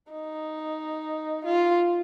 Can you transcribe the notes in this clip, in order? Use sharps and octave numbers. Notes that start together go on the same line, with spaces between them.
D#4
F4